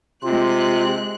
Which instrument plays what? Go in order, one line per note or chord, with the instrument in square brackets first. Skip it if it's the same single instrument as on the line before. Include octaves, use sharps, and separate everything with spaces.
[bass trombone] C3 [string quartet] G#3 F#6 [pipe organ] F4 [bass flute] G4